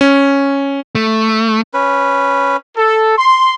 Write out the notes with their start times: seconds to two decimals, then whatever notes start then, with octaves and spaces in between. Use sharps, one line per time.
0.01 C#4
0.95 A3
1.74 C#4 B4
2.77 A4
3.17 C6